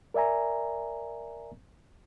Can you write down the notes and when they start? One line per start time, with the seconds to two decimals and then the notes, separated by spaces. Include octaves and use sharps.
0.14 A#4 D5 E5 G#5 A#5